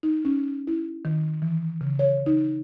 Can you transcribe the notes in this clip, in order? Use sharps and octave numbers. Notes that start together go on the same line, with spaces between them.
D#4
C#4
E4
D#3
E3
C#3
C#5
D#4